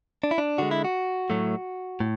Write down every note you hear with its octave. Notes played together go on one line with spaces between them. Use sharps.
D4
E4
D4
D3 G#3 F#4
E4
F#4
A2 F#3 A3
A2